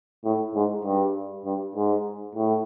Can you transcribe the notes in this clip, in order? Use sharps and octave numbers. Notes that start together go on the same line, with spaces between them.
A2
G#2
G2
G2
G#2
A2